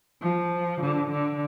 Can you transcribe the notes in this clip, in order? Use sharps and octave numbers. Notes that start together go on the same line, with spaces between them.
F3
D3
D3